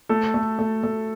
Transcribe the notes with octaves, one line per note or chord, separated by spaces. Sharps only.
A3 A4
A3
A3
A3